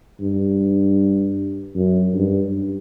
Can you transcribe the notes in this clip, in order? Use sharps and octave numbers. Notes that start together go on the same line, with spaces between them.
G2
F#2
G2